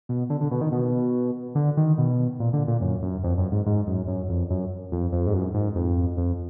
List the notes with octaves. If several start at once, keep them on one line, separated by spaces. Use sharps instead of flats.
B2
D3
D3
B2
D#3
B2
D3
D#3
B2
A#2
D3
A#2
F#2
F#2
F2
F#2
G#2
G#2
F#2
F#2
F2
F#2
F2
F2
G#2
F#2
G#2
F2
F2